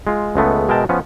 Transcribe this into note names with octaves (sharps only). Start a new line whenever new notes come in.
G#3 F4
C#2 G#3 A3 B3
B2 G#3 A#4 E5 G5 A5
F3 B3 C#4